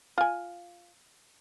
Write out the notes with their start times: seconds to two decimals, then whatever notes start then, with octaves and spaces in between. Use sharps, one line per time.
0.18 F4 G#5